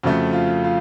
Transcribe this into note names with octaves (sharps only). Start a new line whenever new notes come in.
F2 C#3 F3 A3 F#4
F4
F4